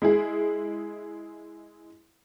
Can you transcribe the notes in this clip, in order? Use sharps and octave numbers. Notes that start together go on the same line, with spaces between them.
G#3 E4 G#4